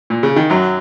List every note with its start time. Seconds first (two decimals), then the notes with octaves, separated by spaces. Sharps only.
0.10 A#2
0.23 C#3
0.36 D#3
0.50 F#2 F#3